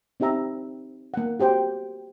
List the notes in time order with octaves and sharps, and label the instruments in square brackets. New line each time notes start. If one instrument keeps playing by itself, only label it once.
[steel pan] C4 D#4 G4 E5 A#5
A#3 F#5
F#4 G4 C5 G5